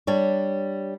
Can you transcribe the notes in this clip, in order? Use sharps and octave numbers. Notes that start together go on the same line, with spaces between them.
G3 D4 C#5